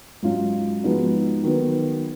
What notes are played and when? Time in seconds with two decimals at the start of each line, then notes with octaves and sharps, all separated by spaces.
0.23 G#2 F#3 C#4 F4
0.83 F3 G#3 B3 D#4 F#4
1.44 D#3 F#3 B3